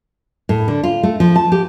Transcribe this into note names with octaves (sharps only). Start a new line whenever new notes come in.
A2
D3
F4
A3
F3
A5
G4